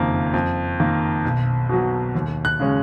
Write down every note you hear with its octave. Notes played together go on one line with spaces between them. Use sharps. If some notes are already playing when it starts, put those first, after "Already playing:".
Already playing: F#1 F2 D#3 A#3
F2
D#3 A#3
B1
B2 F#3
D#2
F#6
C#3 G#3 C#4